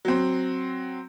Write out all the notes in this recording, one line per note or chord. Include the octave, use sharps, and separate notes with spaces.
F#3 C4